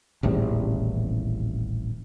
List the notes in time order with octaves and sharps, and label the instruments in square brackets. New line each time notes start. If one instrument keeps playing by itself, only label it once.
[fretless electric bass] D#1 A1 E2 C3